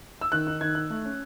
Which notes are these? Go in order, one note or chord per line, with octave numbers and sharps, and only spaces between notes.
E6
D#3 F#6
D#4
D#3 G#6
D#4 F#6
A3
C#4